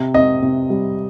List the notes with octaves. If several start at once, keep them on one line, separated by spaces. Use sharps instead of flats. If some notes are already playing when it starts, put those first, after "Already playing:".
Already playing: C3
C4 D#5
C3
G3